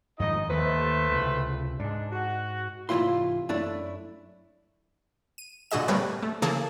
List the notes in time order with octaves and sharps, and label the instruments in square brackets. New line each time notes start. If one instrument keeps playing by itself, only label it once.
[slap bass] F2 G#2 D#3 [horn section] D#4 D#5
[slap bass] D#2 D#3 A#3 [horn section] A3 B4 C5
[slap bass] C#2 C3
[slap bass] G#2 [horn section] G#3 D4
[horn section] F#4
[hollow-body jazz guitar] C2 G#2 E3 E4 F4 C6
F#2 A3 D4 E4
[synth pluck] D#7
A#2 D3 F#4 G#4 D#5 E7
G3 A3 C4 A#4 B4 C#5
A3
C#3 E3 A#3 G#4 A4 A5